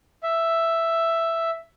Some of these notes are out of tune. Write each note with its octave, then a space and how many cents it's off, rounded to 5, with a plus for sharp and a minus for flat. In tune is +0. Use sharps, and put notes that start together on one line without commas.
E5 +5